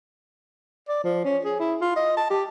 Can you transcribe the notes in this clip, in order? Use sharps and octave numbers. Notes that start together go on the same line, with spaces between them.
D5
F3
C#4
G#4
E4
F4
D#5
A5
G4